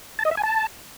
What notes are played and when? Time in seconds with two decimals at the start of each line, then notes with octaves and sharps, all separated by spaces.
0.19 A5
0.25 D#5
0.31 E5
0.37 G#5
0.43 A5